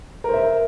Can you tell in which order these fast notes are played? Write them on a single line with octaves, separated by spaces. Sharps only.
A#4 C5 E5